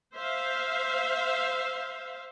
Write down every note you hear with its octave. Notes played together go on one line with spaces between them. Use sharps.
C5 E5 F5